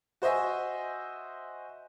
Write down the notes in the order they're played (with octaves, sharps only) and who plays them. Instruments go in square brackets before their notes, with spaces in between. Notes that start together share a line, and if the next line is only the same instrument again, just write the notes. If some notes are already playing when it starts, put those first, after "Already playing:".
[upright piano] F#4 C5 D#5 E5 G#5